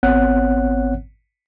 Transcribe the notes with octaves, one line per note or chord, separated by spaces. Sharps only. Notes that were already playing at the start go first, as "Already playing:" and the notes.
G#1 B3 C4 C#5 F#5 F#6